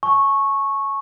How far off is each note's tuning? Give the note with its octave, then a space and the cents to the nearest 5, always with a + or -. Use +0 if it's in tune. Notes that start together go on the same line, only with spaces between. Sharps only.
A5 -40 C#6 -10